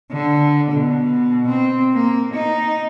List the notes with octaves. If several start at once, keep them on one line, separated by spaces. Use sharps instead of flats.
D3
B2
C4
A#3
D#4